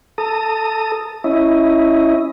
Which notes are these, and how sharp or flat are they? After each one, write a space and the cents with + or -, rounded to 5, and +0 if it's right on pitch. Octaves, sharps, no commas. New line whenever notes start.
A4 +0 A#5 -40 D#6 +0
C#4 +0 E4 +0 D#5 +10